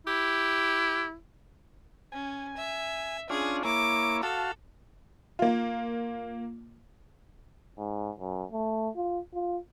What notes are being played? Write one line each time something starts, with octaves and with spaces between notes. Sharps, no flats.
E4 G4
C#4 G#5
E5
C#4 D4 F4 G#4
A#3 E4 C#5 D6
F#4 A4 F5 A5
A#3 F4
G#2
F#2
A3
F4
F4